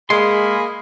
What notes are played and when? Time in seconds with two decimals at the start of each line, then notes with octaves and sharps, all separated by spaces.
0.10 G#3 A#3 G#4 B5 C6